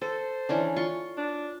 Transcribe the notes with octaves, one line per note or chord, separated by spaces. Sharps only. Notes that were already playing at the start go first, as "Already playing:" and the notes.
A4 C5
E3 C#4 D4
F4 C6 C#6
D4